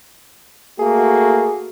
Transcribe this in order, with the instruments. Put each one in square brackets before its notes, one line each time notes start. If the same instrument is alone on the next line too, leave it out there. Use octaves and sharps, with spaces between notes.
[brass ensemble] A3 A#3 F#4 [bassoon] G#4